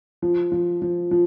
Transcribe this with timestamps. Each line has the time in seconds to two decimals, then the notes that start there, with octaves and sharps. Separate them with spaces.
0.22 F3
0.52 F3
0.82 F3
1.11 F3